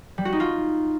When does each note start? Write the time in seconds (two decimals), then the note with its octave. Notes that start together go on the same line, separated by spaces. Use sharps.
0.18 G3
0.25 F#4
0.33 D#4
0.40 F4